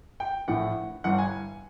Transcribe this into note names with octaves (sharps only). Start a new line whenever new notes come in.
G5
A#1 A2 E3 F#5
G1 G2 E3 F#5
G#5